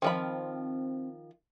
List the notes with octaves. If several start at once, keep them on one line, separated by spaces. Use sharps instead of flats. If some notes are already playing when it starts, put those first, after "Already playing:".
D#3 F3 C4 B5